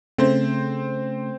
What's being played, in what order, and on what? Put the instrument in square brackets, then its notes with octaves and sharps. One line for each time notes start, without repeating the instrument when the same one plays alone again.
[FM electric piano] C#3 A3 [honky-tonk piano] C4 C5